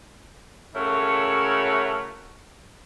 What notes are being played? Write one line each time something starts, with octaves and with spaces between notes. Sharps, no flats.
C#3 A3 E4 F#4 A#4 C#5